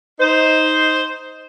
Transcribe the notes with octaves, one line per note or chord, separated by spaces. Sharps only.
D#4 C5